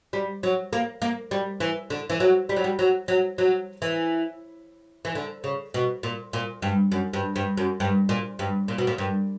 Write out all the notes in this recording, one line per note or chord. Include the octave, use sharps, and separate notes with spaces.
G3
F#3
A#3
A#3
G3
E3
D3
E3
F#3
G3
F#3
G3
F#3
F#3
F#3
E3
E3
D3
C#3
B2
A#2
A#2
G2
F#2
G2
G2
F#2
G2
A#2
G2
A#2
B2
A#2
G2